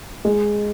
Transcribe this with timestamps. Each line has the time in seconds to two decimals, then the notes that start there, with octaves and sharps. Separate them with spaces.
0.25 G#3